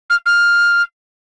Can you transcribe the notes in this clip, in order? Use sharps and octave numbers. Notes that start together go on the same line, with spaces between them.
F6
F6